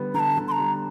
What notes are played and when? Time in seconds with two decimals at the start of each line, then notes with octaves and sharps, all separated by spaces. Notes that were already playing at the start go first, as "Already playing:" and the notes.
Already playing: D3 G3 B3
0.14 D3 A#5
0.19 A5
0.37 D3
0.48 C6
0.52 A#5
0.59 G3